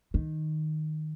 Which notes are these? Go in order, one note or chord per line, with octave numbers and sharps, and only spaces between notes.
D#3